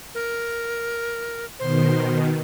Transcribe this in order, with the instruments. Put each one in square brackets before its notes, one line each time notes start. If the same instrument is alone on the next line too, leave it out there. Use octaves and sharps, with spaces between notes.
[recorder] A#4
[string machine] B2 D#3 [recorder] C5